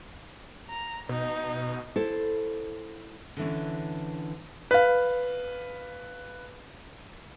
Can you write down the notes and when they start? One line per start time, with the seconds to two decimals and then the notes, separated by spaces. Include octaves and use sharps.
0.70 A#5
1.09 B2 D#4
1.96 E4 A4 C5
3.37 D3 E3 C#4
4.71 B4 F5